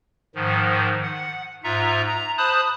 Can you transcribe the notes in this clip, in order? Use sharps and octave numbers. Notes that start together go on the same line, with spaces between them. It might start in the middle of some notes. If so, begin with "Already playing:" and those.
G#2 D#3 F3
F#5
G#2 F4 E5 A#5
A#5
C5 A5 B5 D#6 F#6